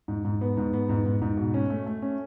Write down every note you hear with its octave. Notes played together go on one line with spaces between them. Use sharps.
G#2
G#2
B3
G#2
B3
G#2
G#2
G#2
B2
C#4
A3
A3
C#4